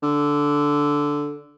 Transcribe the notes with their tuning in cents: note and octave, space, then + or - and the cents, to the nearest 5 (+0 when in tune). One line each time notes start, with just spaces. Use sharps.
D3 -5